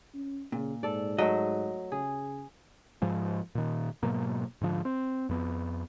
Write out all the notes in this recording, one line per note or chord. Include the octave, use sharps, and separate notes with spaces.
C#4
A#2 C#3
G#2 A4 D5
F#3 A3 D#5
C#3 G#4
G#2 F3 G#3
A#2 D#3
G#2 B2 F#3 A#3
G#2 D3 F3
C4
F2 B3